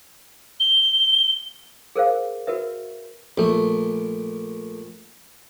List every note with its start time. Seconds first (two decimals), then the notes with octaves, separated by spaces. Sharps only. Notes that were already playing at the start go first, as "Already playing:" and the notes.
0.60 G7
1.96 G#4 A#4 C5 F5
2.47 F#4 A#4 B4 E5
3.38 A#1 A3